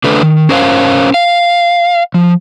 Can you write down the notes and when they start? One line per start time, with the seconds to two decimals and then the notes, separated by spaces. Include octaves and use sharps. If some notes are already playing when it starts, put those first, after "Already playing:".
0.04 D3 A3 D4 B4
0.22 D#3
0.49 C#4 A#4 C5 C#5 D#5 F5
1.14 F5
2.14 F3